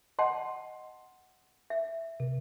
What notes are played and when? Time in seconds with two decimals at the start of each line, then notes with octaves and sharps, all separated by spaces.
0.19 D#5 F#5 A5 C6
1.70 E5
2.20 C3